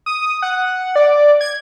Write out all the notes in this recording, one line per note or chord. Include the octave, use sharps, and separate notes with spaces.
D#6
F#5
D5
G#6